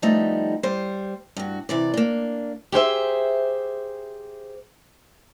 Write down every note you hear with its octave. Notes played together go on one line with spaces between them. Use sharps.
F3 G3 A3 B3 D#4
G3 C5
G2 F#4
C3 E3 D5
A#3 D4
G4 G#4 C5 E5